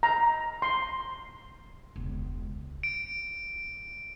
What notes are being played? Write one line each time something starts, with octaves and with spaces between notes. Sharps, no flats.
A#5
C6
E1 C#2
D7